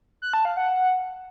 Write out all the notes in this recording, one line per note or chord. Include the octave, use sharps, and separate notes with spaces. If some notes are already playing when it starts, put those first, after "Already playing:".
F#6
A5
F5
F#5